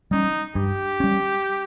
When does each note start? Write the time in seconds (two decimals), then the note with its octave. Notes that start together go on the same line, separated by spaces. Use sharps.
0.11 G3 C#4 D#4
0.55 G2 G4
1.00 G3 C#4